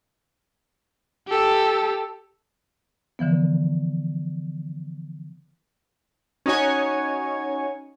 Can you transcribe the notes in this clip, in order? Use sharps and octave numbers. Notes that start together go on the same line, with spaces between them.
G4 A4
D3 E3 F3 B3
C#4 D#4 F#4 C#5 G#5